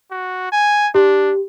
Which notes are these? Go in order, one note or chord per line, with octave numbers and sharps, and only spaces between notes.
F#4
G#5
D4 G4